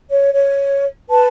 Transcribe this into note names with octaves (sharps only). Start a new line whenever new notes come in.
C#5
C#5
B4 A5